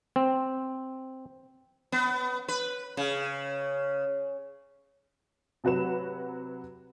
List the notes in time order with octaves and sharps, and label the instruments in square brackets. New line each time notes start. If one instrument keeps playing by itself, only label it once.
[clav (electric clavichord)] C4
[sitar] B3
B4
C#3
[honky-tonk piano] C3 F#3 F#4 B4 E7